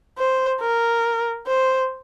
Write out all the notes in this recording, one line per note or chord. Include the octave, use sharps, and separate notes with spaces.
C5
A#4
C5